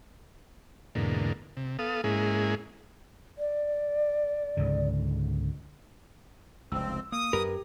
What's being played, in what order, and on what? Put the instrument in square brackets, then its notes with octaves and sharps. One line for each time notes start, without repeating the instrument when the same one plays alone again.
[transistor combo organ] E2 G#2 B2 D3 A#3
C3
B3 A4 F5 D#6
G#2 G#3 A#3 C#4 E4 G#4
[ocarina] D5
[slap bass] C#2 G#2 D3
[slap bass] F1 C#2 [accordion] C4 [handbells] E6
[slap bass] A#3 [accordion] D#6
[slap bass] F#2 [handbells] G4 [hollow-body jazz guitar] A#4 B4